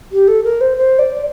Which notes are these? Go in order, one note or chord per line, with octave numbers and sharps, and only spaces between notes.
G4
A4
A#4
C5
C5
D5